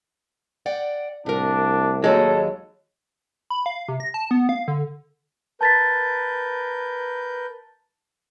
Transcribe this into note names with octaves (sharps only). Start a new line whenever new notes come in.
D5 F#5 G5
C2 A2 D4 A#4
D#2 F#3 G#3 A4
B5
F5
C3
A#6
A5
B3
F5
D3
A#4 B4 A5 G6 A6 B6